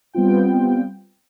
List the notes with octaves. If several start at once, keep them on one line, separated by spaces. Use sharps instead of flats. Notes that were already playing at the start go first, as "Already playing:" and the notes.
G3 B3 C4 F4 G5